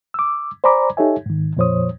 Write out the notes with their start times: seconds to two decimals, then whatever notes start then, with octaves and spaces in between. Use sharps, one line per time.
0.14 D6 E6
0.64 C5 D5 G#5 A#5 B5 D6
0.97 D#4 G4 A4 C#5 E5 G#5
1.26 G#2 D#3
1.57 F2 A#2 F3 C5 C#5 D#6